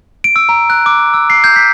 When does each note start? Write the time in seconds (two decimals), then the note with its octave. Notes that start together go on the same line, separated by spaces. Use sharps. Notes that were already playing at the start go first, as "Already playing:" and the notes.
0.24 D7
0.36 E6
0.49 A#5
0.70 F#6
0.86 D6
1.00 E6
1.14 E6
1.30 C7
1.44 G6
1.56 B6